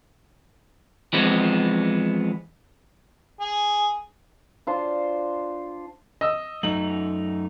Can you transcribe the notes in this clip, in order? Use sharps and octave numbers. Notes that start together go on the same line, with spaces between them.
E3 F3 G#3 B3 C4
G#4
D4 F4 C5
D#5 E6
F#2 A3 D#4 F#7